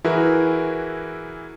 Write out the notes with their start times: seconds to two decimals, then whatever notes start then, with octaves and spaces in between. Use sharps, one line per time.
0.04 E3 E4 F#4 G#4 A#4 B4